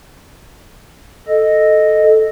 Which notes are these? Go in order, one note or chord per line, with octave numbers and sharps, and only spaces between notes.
A4 D#5